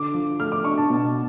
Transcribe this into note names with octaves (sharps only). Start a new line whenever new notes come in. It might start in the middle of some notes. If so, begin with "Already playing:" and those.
Already playing: D3 D6
F3
A3 F6
D6
D4 C#6
A5
B2